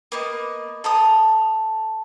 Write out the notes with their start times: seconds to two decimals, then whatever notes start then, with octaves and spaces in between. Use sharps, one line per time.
0.12 A#3 B3 D#5
0.84 A4 A#5 D#6